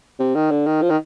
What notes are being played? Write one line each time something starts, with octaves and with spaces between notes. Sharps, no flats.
C3
D#3
D3
D#3
F3
D#3